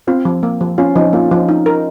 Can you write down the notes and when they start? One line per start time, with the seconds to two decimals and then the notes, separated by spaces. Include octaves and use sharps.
0.07 C4 F4
0.25 F3
0.43 A#3
0.61 F3
0.78 C#4 F4
0.95 F3 D#4
1.13 A#3 F4
1.31 F3 F4
1.49 D#4
1.66 A#4